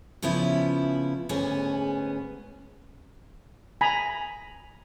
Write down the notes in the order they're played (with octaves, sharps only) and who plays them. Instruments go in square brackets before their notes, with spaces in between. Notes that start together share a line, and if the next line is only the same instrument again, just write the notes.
[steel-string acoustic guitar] C#3 F3 B3 C#4 E4
D2 G#2 B3 C#4 G4 G#4
[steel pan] G#5 A#5 B5